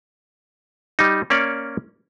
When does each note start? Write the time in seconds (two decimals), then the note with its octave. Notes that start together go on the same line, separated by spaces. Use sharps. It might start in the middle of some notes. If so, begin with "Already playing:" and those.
0.99 G3 D#4
1.30 A#3 C#4 C#5 D5